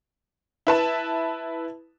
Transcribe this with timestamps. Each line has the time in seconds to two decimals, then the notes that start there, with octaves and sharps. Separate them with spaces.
0.67 E4 B4 A5